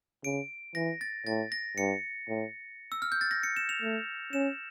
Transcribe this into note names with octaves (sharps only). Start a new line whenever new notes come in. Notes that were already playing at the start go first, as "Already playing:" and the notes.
C#3 D7
E3 A#6
A6
A2 A6
A#6
G2 C#7
A2
E6
F6
G6
A6
A#6
C#7
E7
F7
A3
C#4 E7